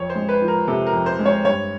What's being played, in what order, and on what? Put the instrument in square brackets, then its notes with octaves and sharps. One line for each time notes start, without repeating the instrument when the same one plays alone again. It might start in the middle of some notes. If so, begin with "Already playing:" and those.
Already playing: [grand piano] F2 C#5
C5
G#3
B4
F3
A#4
C3 A4
A#4
F2
C5
G#3
C#5
G2 C#5